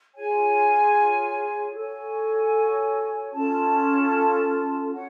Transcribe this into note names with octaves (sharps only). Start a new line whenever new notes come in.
F4 G#4 C#5 G#5
F#4 A4 C#5 G#5
C#4 F4 A4 A5
F#4 C#5 F#5